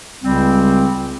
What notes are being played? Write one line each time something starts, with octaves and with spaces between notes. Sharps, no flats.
C#2 C#3 G3 C4